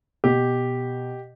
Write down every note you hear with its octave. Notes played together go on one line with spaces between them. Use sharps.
B2 G4